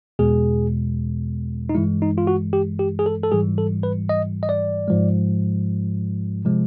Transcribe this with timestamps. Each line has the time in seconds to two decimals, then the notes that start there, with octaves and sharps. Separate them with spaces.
0.19 E2 B2 G#3 G#4
1.69 D#4
1.75 G2 E3 G#3 E4
2.02 D#4
2.18 F4
2.27 F#4
2.53 G4
2.79 G4
2.99 G#4
3.06 A4
3.23 A4
3.32 G#2 E3 G3 G#4
3.58 A4
3.83 B4
4.09 D#5
4.43 D#5
4.49 D5
4.88 G#2 F3 G#3
6.45 C3 F3 G#3